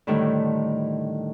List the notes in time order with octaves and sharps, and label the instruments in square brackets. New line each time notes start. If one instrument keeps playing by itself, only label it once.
[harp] A2 D3 D#3 G3 A3 E4